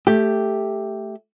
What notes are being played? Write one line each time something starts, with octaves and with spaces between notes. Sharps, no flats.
A3 G4